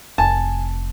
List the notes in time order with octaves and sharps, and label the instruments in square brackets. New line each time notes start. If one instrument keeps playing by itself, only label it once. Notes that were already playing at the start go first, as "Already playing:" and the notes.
[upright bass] F1 [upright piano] G#5 [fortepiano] A5